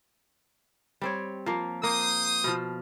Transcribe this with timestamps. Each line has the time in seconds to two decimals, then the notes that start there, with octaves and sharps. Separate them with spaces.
1.01 G3 C4 C#5
1.46 F3 A#3
1.83 A#3 C5 D#6
2.44 B2 F3